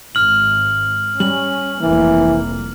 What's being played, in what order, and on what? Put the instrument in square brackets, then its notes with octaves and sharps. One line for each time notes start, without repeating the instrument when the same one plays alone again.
[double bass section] G#1 [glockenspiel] F6 F#7
[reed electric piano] G3 [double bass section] C#4 [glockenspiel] F#7
[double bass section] F1 C2 A#3 [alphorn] E3